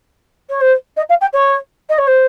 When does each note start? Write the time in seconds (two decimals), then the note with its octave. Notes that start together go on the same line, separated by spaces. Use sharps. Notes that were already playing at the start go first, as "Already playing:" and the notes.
0.49 C#5
0.61 C5
0.96 D#5
1.09 F5
1.21 G5
1.33 C#5
1.89 D#5
1.98 C#5
2.07 C5